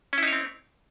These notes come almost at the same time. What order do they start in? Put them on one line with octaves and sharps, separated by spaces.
C#4 E4 D#4 C#5 C4